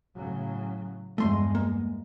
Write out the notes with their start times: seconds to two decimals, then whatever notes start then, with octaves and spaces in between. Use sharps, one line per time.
0.16 A2 C#3 F#3
1.18 E2 G2 G#3 A3 C6
1.55 A#3